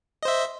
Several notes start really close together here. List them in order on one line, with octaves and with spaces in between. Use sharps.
D#5 C5 E5